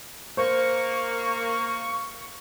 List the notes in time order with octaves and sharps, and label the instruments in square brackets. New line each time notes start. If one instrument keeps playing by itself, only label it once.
[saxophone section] A#3 [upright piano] C5 [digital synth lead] C#6